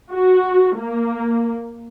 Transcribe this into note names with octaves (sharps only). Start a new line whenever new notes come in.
F#4
A#3